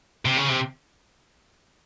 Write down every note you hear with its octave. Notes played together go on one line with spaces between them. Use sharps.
C3
C#3
C3